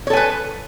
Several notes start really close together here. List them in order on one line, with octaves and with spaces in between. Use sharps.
C#5 A4 G#5 B4